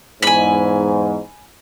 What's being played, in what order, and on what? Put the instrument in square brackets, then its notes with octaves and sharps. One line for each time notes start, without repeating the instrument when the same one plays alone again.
[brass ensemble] E2 G#2 [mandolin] G#5 B5